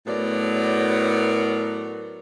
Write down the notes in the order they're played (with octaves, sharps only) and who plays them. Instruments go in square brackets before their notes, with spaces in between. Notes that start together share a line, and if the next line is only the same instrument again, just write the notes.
[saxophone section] A2 F#3 B3 A#4 D5